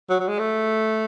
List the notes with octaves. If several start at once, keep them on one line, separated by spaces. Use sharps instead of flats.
F#3
F#3
G#3
A3